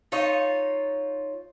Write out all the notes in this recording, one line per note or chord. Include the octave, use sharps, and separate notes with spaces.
D#4 F4 C#5 D#5